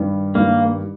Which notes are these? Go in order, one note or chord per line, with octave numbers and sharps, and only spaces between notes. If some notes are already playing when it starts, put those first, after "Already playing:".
Already playing: G2 D#3 G3
G2 D#3 G3 A#3